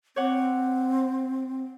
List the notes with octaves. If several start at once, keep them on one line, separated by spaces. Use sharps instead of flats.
C4 C#5 D5 F#5